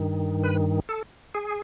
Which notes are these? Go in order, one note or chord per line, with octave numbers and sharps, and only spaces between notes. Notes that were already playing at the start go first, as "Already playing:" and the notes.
Already playing: G2 D#3
B4
A4
G#4